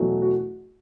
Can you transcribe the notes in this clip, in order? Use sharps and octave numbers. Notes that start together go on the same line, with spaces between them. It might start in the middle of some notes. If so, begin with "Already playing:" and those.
Already playing: E2 B2 F#3 A3
F#4